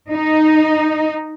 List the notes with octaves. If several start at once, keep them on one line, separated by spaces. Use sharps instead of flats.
D#4